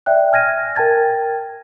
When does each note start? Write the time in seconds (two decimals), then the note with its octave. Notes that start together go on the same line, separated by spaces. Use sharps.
0.06 D5 E5 G5 F#6
0.32 G#5 F6 G#6 A#6 D#7
0.75 A#4 G5 A5 G#6 A6